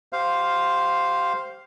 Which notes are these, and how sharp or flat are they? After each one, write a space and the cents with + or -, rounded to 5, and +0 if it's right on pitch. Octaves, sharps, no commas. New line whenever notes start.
G4 -30 C5 +0 F5 +0